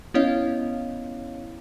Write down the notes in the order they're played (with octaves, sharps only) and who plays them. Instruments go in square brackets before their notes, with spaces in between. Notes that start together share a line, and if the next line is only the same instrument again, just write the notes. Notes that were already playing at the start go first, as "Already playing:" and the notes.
[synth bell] B3 C#4 E4 C#5 D#5 F5